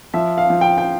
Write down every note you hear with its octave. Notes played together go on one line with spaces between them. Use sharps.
F3 E5
F5
F3
G5
G5